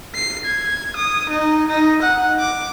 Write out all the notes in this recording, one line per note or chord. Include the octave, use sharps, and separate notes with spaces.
C7
G#6
D#6
D#4
D#4
F#5
D6